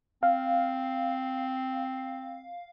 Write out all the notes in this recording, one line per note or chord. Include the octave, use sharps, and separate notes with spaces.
C4 F5